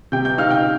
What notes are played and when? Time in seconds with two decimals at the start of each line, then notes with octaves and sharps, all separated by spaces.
0.12 C3 G5 G6
0.25 G5 G6
0.38 D#4 F5 F6
0.50 G5 G6